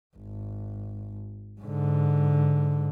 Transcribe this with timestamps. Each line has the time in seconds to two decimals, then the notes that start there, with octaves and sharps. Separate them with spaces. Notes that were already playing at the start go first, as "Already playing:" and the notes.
0.17 G#1
1.61 G#2 D3